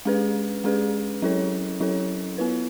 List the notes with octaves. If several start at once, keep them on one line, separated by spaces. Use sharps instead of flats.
G#3 C#4 G#4 B4
G#3 C#4 G#4 B4
F#3 C#4 E4 A4 C#5
F#3 C#4 E4 A4 C#5
B3 E4 B4